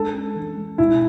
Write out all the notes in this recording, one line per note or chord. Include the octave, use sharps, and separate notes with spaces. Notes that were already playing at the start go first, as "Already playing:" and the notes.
Already playing: G#3 D4 A4
C#4
E3
G#3
B2 E4